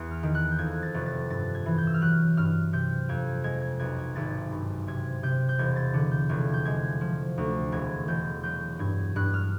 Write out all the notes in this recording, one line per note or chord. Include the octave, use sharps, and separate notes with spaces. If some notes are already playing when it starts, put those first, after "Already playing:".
Already playing: E2
F6
D#3
F#6
G6
F2 G#6
A6
F1
A6
G2 A6
G#6
E3
G6
E6
F6
F#3 F#6
G2 F6
C3 G6
F2 G#6
G#3 G#6
G#6
B1 G#6
G#6
G#1 A6
G2
C3 G#6
C3 G6
G6
E1 G#6
A6
D3
G6
F1 G#6
G6
G#3 G#6
F3
D2
E1 G#6
E1 G6
F#3 G6
G2 G#6
G2 F#6
F6